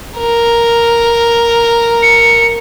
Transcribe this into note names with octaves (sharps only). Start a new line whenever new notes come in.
A#4
C#7